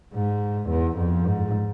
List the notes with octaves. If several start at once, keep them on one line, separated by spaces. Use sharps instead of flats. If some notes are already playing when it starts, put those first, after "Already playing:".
G#2
E2
F2
G#2